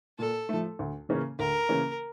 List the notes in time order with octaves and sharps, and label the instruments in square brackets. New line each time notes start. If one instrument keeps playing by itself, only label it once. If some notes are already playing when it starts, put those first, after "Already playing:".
[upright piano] A#2 [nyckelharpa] A4
[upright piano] F3 A3
D2
C#3 E3 A#3 C#4
[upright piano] D2 [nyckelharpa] A#4
[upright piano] C#3 E3 A#3 C#4